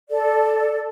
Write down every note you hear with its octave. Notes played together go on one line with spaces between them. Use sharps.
A4 D5